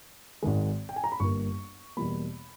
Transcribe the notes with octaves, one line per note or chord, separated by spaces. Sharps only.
G#1 G#2 D#3 G#3
G5
G#5
A#5
B5
G1 G2 G3 A#3 C#6
E2 B2 G3 A#3 B5